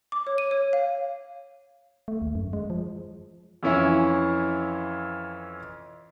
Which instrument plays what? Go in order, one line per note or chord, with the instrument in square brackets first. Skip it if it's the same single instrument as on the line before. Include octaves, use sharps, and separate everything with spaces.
[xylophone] D6
C#5
D#7
C#5
F5
[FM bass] A3
D#2
F#2
G#3
F3
[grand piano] F2 E3 C#4 E4